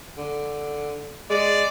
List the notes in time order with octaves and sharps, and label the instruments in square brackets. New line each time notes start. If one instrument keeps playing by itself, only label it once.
[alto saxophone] D3
[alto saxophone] G#3 [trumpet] D5